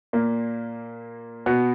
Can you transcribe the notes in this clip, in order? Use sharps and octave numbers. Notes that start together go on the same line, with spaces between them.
A#2 A#3
B2 B3